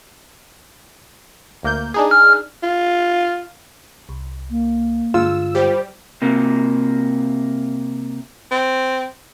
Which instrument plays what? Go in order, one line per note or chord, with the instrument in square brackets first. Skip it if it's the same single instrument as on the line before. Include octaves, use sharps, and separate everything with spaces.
[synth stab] D2 A#3 G6
D4 D#4 G#4
[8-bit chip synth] F6
[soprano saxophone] F4
[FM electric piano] C2
[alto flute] A#3
[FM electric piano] G2 D3 G#3 [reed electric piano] F4 [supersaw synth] E6
[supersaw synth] G3 G4 [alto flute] C5
[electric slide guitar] C3 A#3
[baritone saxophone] C4